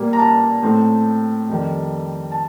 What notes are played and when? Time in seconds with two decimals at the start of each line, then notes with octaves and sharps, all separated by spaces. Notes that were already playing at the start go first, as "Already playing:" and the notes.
Already playing: A#2 G3 A#3
0.13 A#5
0.19 A5
0.63 A2 A3 C4
1.49 F2 D#3 G3
2.32 A5